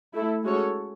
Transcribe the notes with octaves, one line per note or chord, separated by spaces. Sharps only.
A3 E4 A4
G#3 C#4 F#4 A4 C#5